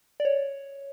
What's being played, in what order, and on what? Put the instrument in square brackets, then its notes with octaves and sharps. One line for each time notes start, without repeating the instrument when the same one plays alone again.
[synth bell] D5
C#5